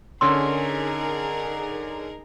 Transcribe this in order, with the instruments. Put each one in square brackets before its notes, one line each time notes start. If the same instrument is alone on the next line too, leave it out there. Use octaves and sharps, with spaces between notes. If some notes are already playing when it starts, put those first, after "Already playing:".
[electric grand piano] D3 C#4 E6 [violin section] D#4 G#4 A#4 [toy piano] C6